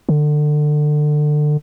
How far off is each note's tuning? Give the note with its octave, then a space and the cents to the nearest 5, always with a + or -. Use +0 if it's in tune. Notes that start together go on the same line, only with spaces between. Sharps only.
D3 +25